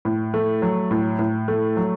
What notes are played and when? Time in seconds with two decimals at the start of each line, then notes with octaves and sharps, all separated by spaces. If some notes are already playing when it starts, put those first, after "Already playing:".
0.05 A2
0.34 A3
0.62 F#3
0.91 A2
1.19 A2
1.48 A3
1.77 F#3